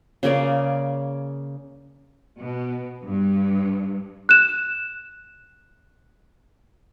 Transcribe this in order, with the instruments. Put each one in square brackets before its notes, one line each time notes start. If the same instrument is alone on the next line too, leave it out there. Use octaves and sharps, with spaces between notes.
[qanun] C#3 A#3 G#4 D5
[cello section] B2
G2
[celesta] F#6 E7